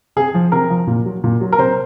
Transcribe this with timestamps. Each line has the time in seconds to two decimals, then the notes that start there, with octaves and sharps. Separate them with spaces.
0.16 C3 G#4
0.34 F3
0.52 C3 A#4
0.70 F3
0.87 A#2
1.05 F#3
1.24 A#2
1.41 F#3
1.53 A#4
1.58 C3 C5